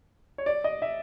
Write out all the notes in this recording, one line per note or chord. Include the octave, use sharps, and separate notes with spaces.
C#5
D5
D#5
E5